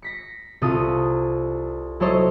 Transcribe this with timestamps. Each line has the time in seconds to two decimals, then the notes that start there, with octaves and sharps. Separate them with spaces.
0.02 A#6 B6 C#7
0.62 C2 C3 F4 A4 D#6
2.00 F#3 E4 A4 C5 C#5 D#5